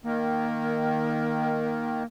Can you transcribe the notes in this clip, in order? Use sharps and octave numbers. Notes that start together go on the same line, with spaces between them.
D#3 A#3